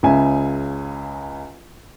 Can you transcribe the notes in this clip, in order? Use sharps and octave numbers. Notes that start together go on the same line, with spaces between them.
C#2 C#3 E5 G#5